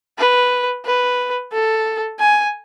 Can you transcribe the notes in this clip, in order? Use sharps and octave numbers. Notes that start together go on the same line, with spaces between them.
B4
B4
A4
G#5